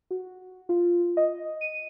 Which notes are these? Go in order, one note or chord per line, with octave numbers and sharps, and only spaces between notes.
F#4
F4
D#5
D#7